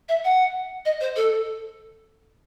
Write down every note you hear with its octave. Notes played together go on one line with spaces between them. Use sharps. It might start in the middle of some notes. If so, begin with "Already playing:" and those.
E5
F#5
D#5
C5
A4